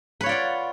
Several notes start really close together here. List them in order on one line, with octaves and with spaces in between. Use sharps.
B4 C#5 F4 D5 F#5